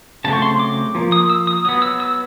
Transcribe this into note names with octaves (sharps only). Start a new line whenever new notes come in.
C#3 F#3 A3 C4 A5
C#6
C6
D6
F3 A#3
D#6
E6
D#6
F#3 B3 D#6
E6
E6